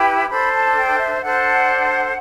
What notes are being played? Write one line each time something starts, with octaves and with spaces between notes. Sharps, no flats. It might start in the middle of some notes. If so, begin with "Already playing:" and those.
Already playing: E4 G4 B4 G5
D4 A4 C5 B5
A5
G5
E5
D4 A4 C5 F#5